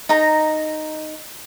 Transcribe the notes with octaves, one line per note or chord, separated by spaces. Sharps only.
D#4 A#5